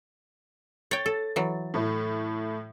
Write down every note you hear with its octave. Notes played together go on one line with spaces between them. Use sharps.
C#5 G5 A6
A4
E3 F#3
A2 A3